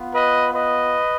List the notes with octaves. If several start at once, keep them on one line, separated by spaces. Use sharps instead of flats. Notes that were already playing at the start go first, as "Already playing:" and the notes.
Already playing: B3 F4
B4 D#5
B4 D#5